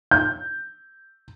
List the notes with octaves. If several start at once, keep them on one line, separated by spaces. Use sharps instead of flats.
G6